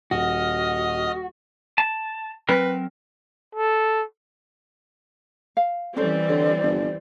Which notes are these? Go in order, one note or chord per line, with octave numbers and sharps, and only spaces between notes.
D#1 F#4 D#5 D#6 F6
A5
F#3 C4 A#4 B4
A4
F5
E3 G3 C4 C#4 A4 C5 D5
D3 C#5
G1